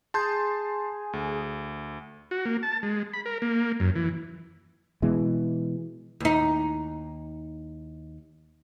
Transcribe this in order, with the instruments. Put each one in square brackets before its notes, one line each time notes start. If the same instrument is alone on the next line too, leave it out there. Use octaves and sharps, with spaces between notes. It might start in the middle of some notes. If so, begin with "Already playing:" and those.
[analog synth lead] G#4 [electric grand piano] A5 C6 G6
[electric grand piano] D2
[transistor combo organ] F#4
A#3
A5
G#3
B5
A#4
A#3
F#2
E3
[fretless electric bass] B2 E3 G#3
[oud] D#2 D#4